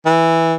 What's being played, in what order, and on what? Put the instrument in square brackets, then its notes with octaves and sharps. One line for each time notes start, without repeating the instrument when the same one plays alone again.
[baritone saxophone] E3